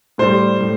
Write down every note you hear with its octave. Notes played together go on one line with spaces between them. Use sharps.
A2 G3 C5
A2 G3